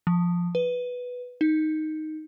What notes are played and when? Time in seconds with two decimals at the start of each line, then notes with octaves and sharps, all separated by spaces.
0.07 F3
0.55 B4
1.41 D#4